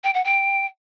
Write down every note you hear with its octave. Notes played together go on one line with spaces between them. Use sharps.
G5
F#5
G5